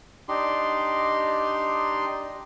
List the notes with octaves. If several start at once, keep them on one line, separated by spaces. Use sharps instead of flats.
D4 D#4 G4 C6